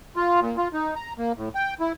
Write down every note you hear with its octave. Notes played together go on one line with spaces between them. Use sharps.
F4
A#2
F4
D#4
A#5
A#3
A2
G5
E4